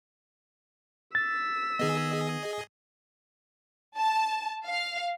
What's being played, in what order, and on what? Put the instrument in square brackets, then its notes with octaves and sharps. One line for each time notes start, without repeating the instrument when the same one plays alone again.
[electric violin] E6 B6 [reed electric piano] A6
[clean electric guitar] D#3 B3 [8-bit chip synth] G#4 D#5
[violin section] A5
F5